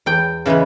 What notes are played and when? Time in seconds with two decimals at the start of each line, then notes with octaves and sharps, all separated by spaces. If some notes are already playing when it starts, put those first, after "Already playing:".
0.06 E2 G5
0.46 C#3 E3 G#3 B3